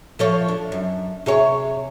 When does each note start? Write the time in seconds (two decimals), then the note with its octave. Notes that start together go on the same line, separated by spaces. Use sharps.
0.19 F3 A4 C#5
0.48 D4
0.72 F#2
1.26 C3 G#4 C#5